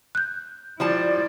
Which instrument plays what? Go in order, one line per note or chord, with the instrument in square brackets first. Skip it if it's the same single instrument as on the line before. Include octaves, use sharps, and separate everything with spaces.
[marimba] F#6 G6
[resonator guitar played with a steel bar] F3 G3 A5 [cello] E4 D5